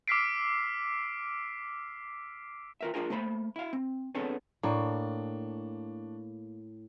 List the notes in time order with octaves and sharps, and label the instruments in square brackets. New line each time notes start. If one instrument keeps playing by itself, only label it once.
[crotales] D6 E6 F6 B6 C7 D7
[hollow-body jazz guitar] F4 A#4 E5
D4 F4 G#4 A#4
A3 A#3 C5 A#5 B5
E4 F5
C4
B3 C4 D4 G#4 A4 C#5
[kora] A2 A#3 [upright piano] D4 C#6